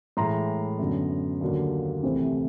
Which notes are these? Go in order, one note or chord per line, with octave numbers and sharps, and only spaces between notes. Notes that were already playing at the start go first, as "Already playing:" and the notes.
A2 E3 G#3 A#5 C6
F#2 D3 F#3 B3
D#2 D3 F#3 A#3
C2 C3 E3 A3 C4